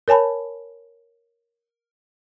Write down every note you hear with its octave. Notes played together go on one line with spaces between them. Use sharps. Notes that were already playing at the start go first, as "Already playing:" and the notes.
A#4 C#5 G#5 A5 B5